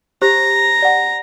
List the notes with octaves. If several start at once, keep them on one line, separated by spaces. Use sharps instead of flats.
G4 C5 A#5
D5 F#5